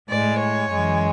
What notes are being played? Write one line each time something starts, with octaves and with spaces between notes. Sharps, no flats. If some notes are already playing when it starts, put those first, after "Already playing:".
A2 G#3 D5
C#5
F#2 E3 G#3